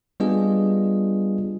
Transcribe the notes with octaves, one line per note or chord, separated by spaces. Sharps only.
G3 B3 D4 F4 G#4 D#5